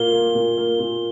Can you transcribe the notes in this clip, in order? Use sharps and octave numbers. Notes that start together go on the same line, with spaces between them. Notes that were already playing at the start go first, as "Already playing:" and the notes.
Already playing: A#2 A#3 G7
A#3
A#2
A#3
A#2